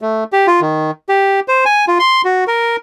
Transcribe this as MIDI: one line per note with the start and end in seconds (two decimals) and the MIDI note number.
0.02 0.24 57
0.32 0.47 67
0.47 0.60 65
0.61 0.91 51
1.09 1.40 67
1.48 1.64 72
1.65 1.85 80
1.88 1.98 65
1.99 2.22 84
2.25 2.44 66
2.47 2.76 70